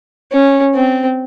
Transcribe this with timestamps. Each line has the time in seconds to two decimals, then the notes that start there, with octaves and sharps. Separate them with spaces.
0.32 C#4
0.75 C4